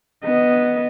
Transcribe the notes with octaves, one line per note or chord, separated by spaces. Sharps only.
B3 D#5